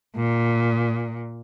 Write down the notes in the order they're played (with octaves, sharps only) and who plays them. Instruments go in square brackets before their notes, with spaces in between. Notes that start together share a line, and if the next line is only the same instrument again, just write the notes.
[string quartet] A#2